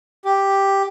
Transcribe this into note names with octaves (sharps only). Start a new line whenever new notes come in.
G4